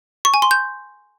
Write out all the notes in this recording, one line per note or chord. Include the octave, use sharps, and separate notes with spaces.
C#6
G#5
C6
G6